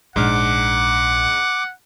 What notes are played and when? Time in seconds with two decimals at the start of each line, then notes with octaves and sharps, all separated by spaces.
0.16 A#1 G#2 D4 F#5 D6 F6